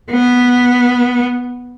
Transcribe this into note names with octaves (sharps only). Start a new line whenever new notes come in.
B3